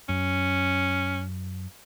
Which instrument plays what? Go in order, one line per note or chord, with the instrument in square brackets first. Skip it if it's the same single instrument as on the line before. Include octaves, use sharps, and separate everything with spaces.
[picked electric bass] F#2 [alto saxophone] C#4